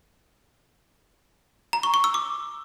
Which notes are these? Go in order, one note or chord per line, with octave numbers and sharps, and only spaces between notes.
A#5
C#6
C#6
E6
D6